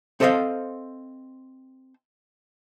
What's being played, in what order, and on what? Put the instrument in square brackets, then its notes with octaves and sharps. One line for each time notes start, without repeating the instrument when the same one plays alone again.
[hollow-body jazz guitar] C4 A4 C5 D5 D#5 F5